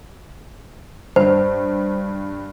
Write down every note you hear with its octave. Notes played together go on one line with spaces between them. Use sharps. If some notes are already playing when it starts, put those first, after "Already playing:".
G2 C5